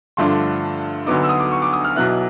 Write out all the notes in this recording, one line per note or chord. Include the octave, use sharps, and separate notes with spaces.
G2 D3 F3 A3 D4 C6
D2 D3 F#3 B3 D#4 D6
E6
D#6
D6
C#6
D6
D#6
F6
B1 B2 F#3 B3 E4 F#6